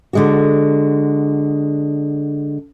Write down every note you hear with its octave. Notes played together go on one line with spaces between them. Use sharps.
D3 G#3 F#4